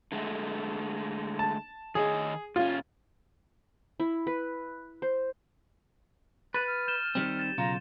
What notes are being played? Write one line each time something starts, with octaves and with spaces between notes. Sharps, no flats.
D3 G#3 A3
A5
D#3 G#4 C#5 D#5
A#2 C#4 F4
E4
B4
C5
B4 F#6 A6 D#7
F6
G6 E7 G7
D#3 G3 C4
A6 E7
B1 C#3 F4 A#5